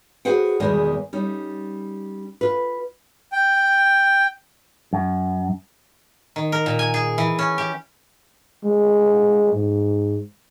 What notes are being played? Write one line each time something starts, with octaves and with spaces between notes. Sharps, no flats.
F#4 G#4 B4 C5 F#5 G5
E2 B2 D#3 G3 G#3 A#3
G3 C#4 D#4
F4 B4
G5
F#2
D#3
A#4
A#2
G#5
G#4
E3
C#4
G4
G#3
G#2